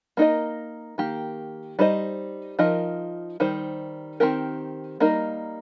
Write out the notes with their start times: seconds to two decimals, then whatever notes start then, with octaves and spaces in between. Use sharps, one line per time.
0.17 A#3 D#4 A#4 D#5
0.98 D#3 A#3 G4
1.79 G3 D#4 C5 D#5
2.59 F3 D#4 A#4 D#5
3.40 D#3 G3 D#4 C5
4.20 D#3 C4 G4 A#4
5.00 G3 A#3 D#4 A#4